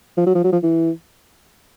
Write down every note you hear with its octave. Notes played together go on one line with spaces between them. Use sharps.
F3
F#3
F3
F#3
F3
E3